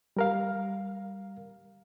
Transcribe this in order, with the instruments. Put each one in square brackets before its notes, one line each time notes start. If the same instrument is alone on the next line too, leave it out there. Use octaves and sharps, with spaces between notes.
[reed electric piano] G3 A#4 F5